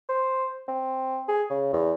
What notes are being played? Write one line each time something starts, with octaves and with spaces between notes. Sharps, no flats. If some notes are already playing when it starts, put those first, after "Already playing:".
C5
C4
G#4
C#3
E2